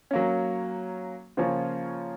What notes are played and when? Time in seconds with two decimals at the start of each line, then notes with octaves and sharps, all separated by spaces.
0.11 F#3 A#3 C#4
1.37 C#3 F3 A#3 C#4 F4